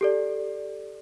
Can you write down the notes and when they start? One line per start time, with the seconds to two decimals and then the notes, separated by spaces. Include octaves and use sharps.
0.01 G4 A4 D5